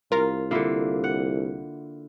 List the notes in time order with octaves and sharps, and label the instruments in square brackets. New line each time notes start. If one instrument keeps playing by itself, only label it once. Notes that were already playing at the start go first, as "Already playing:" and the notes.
[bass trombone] C2 [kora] F4 [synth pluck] A#4 A#5
[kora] D3 A#3 [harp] E4 F4
[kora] F#5